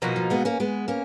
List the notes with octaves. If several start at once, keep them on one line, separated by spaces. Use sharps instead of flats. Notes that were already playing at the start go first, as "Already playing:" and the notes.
B2 F3 A#3 D#4 F#4
F3
G#3 B3
A#3 C#4
G#3 B3
A#3 C#4